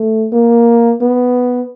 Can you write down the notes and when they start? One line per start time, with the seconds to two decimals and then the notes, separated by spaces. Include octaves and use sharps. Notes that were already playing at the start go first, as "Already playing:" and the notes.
Already playing: A3
0.32 A#3
1.01 B3